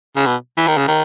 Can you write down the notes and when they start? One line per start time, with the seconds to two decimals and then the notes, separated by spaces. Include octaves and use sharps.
0.16 C#3
0.26 B2
0.57 E3
0.68 D#3
0.78 C#3
0.88 D#3